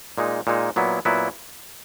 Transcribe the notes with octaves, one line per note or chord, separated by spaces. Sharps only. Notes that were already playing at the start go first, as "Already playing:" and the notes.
A#2 G#3 D#4
A#2 G#3 D#4
A#2 F#3 B3 E4
A#2 F#3 B3 E4